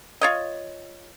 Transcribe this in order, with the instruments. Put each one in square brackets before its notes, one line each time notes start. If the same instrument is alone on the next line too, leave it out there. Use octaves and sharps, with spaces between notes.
[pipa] F4 C#5 D#5